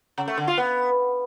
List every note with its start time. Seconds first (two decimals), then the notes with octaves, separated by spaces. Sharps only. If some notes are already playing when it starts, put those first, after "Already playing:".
0.18 C#3
0.28 A3
0.38 D3
0.48 F4
0.57 B3